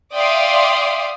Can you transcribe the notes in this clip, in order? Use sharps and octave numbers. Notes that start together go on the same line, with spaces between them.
D5 E5 F5 G5 C6 D#6